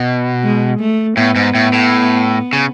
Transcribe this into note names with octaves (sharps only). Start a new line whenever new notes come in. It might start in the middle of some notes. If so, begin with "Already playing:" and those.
Already playing: B2
G#3
A3
A2 B3
G#2
A2
A2
C#3